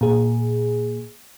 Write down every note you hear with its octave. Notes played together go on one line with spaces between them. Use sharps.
A#2 G#4